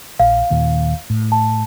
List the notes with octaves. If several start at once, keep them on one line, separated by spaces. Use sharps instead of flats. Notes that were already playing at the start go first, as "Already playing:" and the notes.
A#1 F5
D#2 A#2 D#3
A2
A5